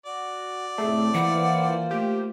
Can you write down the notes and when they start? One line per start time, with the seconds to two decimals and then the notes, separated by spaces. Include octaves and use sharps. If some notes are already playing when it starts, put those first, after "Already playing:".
0.06 F#4 D5
0.78 F2 A2 C3 A3 G#4
1.15 E3 A#3 F4 C5 F#5
1.91 A3 G4